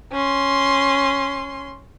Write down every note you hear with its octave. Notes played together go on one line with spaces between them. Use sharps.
C#4 C6